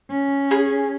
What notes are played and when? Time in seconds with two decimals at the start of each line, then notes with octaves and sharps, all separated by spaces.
0.11 C#4
0.51 G#4